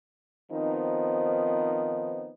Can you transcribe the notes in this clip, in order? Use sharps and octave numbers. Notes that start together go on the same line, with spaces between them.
D#3 F3 B3 C4 D#4